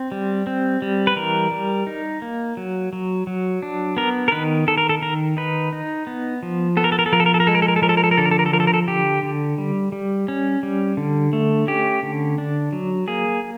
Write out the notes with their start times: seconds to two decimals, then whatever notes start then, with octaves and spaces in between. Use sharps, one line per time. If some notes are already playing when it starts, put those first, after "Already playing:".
Already playing: C4
0.12 G3
0.47 C4
0.82 G3
1.07 B4
1.16 E3 A#4
1.51 G3
1.87 D#4
2.22 A#3
2.57 F#3
2.93 F#3
3.27 F#3
3.62 D4
3.97 B3 A#4
4.28 A#4
4.32 D#3 B4
4.68 D#3 A4
4.78 A#4
4.89 A4
5.02 D#3 A#4
5.37 D#4 B4
5.73 D#4
6.07 B3
6.43 F3
6.77 B3 A4
6.84 A#4
6.92 A4
6.99 A#4
7.06 A4
7.13 F3 A#4
7.20 A4
7.26 A#4
7.34 A4
7.40 A#4
7.47 G#3 A4
7.55 A#4
7.62 A4
7.68 A#4
7.76 A4
7.82 F3 A#4
7.89 A4
7.97 A#4
8.04 A4
8.11 A#4
8.17 D3 A4
8.25 A#4
8.31 A4
8.39 A#4
8.46 A4
8.53 F3 A#4
8.60 A4
8.67 A#4
8.74 A4
8.88 D3 G4
9.23 D3
9.58 G3
9.92 G3
10.28 C#4
10.63 G3
10.97 D3
11.33 A3
11.67 C#4 G4
12.03 D3
12.38 D4
12.73 F#3
13.08 A#3 G#4